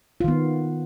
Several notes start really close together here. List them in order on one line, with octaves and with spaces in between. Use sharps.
F4 D#3 B3